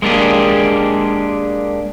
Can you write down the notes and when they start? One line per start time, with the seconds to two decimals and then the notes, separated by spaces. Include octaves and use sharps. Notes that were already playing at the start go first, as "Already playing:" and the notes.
0.02 G#3 A#3 D4 G4 G#4